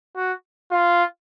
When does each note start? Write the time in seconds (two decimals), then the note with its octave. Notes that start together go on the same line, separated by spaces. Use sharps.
0.16 F#4
0.71 F4